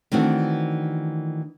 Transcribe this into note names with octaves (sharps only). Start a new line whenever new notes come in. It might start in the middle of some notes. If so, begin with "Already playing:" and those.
D#3 E3 A3 C4 D4 F#4